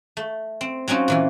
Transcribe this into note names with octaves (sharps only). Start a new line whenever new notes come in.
A3
C4
F#3 C4 C#4 D#4 F4
A#2 E3 F4